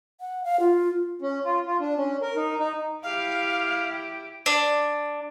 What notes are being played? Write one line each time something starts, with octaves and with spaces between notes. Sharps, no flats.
F#5
F5
F4
C#4
F4
F4
D4
C#4
A#4
D#4
D#4
E4 G4 F5
D4